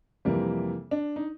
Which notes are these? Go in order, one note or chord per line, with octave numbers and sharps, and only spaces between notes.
F2 C3 E3 G3 A#3
D4
D#4